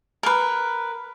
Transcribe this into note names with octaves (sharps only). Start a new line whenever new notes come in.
A#4 B4